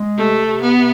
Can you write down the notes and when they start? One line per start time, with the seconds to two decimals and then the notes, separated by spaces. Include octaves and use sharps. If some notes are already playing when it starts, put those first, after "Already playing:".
Already playing: G#3
0.16 C3 A3
0.46 C3
0.61 B3
0.75 C3